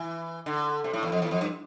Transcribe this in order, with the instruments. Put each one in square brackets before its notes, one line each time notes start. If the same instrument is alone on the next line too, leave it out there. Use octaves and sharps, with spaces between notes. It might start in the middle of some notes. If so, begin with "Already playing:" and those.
Already playing: [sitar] E3
D3
C3
A2
E2
F2
E2
F2
G2